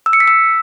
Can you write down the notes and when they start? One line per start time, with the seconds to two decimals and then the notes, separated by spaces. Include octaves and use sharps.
0.06 E6
0.13 C#7
0.20 B6
0.28 E6